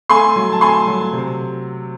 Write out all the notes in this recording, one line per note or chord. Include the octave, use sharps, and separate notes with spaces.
A3 G#5 C6
F#3
A5
A3 G#5 C6
F#3
C3